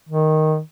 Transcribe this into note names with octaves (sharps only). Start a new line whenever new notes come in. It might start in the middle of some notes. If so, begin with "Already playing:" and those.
D#3